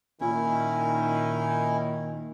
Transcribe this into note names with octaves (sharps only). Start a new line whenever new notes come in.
A#2 D#3 C#4 E4